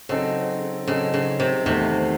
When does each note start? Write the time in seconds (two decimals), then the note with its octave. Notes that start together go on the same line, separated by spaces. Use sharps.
0.09 C#3 F#3 C4 D#4 A4
0.88 C#3 F#3 C4 D#4 A4
1.14 C#3
1.40 C3
1.65 E2 C3 D#3 A3